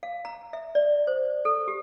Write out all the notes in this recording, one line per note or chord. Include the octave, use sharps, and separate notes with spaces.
F5
A#5
E5
D5
C5
A4
G4